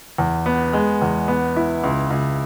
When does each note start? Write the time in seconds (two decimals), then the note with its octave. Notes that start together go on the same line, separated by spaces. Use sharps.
0.18 E2
0.46 B3
0.73 G#3
1.02 E2
1.28 B3
1.56 E4
1.84 C#2
2.11 C#2